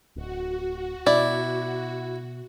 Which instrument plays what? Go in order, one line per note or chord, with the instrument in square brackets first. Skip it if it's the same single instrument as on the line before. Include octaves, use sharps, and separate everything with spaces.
[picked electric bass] D1 [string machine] F#4
[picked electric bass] B2 [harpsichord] E4 [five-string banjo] D5